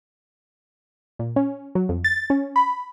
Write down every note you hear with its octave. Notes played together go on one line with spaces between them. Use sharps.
A#2
C#4
F#3
F2
A6
C#4
B5